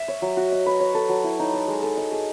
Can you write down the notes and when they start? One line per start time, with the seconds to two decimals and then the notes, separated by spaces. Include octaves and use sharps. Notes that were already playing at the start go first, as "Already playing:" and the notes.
Already playing: E5
0.08 C#5
0.22 F#3
0.37 F#4
0.52 D#5
0.66 B4
0.80 C#5
0.95 A4
1.09 F#3
1.24 E4
1.39 D#4
1.53 D#5
1.68 G#3
1.83 A4
1.97 D#5
2.12 G#4